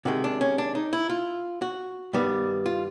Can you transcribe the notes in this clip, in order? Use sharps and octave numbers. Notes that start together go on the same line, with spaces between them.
C3 D#3 G#3 F#4
D4
C#4
D4
D#4
E4
F4
F#4
G2 D#3 G3 B3
F4